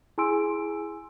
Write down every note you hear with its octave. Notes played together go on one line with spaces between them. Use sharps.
E4 G#4 G#5 C6 E6 D7